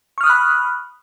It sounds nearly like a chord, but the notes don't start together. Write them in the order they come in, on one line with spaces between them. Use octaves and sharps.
C#6 F6 D#6 F#6 B5